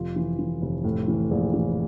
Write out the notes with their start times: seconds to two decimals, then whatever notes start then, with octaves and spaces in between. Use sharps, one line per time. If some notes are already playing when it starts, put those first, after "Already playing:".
Already playing: F1 F3 F4
0.16 E3
0.39 E3
0.62 F1
0.84 A2
1.08 E3
1.31 A#1
1.54 E3